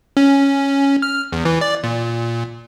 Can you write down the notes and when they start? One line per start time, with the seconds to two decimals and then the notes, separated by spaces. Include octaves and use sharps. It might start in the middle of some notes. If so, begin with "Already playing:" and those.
0.17 C#4
1.02 F6
1.33 E2
1.45 E3
1.61 D5
1.83 A#2